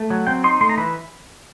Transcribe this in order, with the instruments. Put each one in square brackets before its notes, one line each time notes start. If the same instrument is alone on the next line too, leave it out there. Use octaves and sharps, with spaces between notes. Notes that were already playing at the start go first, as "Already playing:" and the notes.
Already playing: [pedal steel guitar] A3
F#3
C4 G5
D#4 C6
A3 C6
A#5
E3 B5